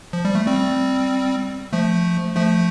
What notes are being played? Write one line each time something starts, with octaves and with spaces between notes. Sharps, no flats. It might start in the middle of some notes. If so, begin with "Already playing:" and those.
F3
G3
A3
G3 C4
F3 A3
F3 A3